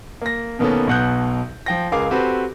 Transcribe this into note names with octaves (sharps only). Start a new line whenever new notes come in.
A#3 A#6
B2 D#3 A#3 B3 C#4 A4
B1 B2 F#5 F#6 G6
F3 G5 A#6
C#2 G#4 A#4 F5 D6
C4 F#4 G4 A4 B4 C5